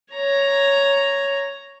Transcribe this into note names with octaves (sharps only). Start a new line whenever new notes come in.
C#5 A#5